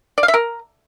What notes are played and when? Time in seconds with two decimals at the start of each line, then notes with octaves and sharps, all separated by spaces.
0.18 D5
0.23 F5
0.28 E5
0.34 A#4